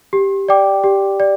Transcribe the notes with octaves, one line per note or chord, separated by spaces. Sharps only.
G4
D5 G5 D6
G4
D5